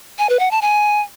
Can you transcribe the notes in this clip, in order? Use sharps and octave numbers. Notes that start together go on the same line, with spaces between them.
G#5
B4
F#5
A5
G#5